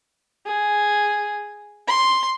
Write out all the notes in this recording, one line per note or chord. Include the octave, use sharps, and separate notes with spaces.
G#4
C6